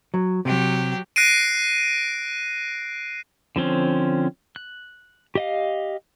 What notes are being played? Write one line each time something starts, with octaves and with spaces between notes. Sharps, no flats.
F#3
C3 F#3 G4
F#6 A#6 C7 D7 D#7
D3 F3 C4 C#4
F#6
G4 D#5 F5